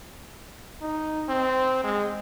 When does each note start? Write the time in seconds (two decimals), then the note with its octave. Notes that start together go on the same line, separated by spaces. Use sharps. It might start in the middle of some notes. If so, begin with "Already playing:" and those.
0.81 D#4
1.28 C4
1.84 G#3